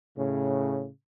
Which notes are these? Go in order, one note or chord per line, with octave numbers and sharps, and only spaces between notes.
A2 C#3